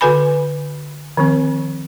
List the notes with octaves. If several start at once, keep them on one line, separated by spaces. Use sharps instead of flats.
D3 F#4 A4 B4 G#5 B5
D#3 F3 C4